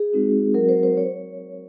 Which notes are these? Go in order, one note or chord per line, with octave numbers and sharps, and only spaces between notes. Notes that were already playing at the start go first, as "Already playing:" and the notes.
Already playing: G#4
G#3 C4 D#4 F#4
F#3 C4 F#4 A#4
C5
C5
C#5